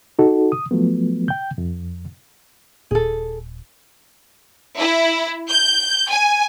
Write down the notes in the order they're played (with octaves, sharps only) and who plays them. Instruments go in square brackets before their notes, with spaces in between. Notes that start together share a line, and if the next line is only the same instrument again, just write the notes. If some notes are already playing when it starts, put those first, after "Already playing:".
[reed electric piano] D#4 F#4 A4
D#6
F3 F#3 A3 B3
G5 G6
F2
[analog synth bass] D#1 [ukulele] G#4 A4
[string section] E4
G6
G#5